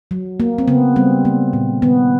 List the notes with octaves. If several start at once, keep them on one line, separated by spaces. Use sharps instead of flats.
F#3
A#3
C4
C#3 B3
G3 C4
A#3
A#2
D#3 B3